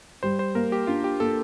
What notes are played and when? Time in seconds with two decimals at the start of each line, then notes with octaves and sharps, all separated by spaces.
0.23 G3 C5
0.39 C5
0.55 A#3 A#4
0.72 G4
0.87 D4 F4
1.04 G4
1.20 A#3 A4